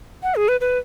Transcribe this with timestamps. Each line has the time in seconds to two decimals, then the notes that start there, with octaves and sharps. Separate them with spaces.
0.23 F#5
0.35 G#4
0.48 B4
0.61 B4